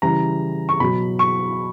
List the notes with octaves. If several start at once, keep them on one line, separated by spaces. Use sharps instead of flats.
C#3 E3 G3 A#5
C#6
B2 F#3 B5
C#6